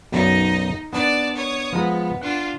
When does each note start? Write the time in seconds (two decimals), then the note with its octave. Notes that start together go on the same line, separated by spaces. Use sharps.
0.12 B1 F#2 D#4 D5 D#5
0.93 B3 D4 D5 A5
1.36 C#5 D#6
1.73 F3 G#3 B3 A#5
2.22 D4 F4 F#5